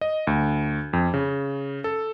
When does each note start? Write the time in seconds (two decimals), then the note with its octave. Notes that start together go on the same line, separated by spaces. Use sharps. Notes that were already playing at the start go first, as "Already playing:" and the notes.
0.01 D#5
0.27 D2
0.93 F2
1.14 C#3
1.84 A4